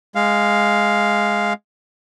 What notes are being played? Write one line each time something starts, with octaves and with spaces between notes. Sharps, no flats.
G#3 F5